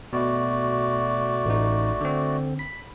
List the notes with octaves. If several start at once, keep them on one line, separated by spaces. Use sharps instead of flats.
B2 A3 F#4 D5
A1 D#4
D3 C4
B5 B6